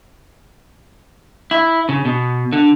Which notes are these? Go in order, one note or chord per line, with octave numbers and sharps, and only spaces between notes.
E4
C#3
B2
D3